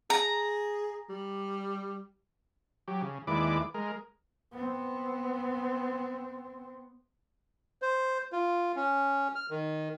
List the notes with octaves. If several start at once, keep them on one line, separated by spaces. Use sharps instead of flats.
G#4 A#5
G3
F#3 G4
C#3
D#2 G#3 E4 B4 D5 D6
G#3 A#4
B3 C4
C5
F4
C#4
F6
D#3